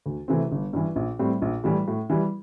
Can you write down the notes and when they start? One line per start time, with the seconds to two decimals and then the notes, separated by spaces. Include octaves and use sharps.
0.06 D2
0.28 C3 E3 A3 C4
0.52 G1
0.73 G2 E3
0.96 A#1
1.19 A2 G3 C4
1.42 A#1
1.64 A2 E3 G3
1.88 A2
2.10 E3 G3